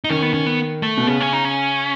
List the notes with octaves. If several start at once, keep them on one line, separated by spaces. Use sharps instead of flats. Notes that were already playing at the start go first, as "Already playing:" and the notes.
D#4
D#3 C#4
B3
C#4
B3
A3
B2
C#3 B3
C#4
D#4
C#4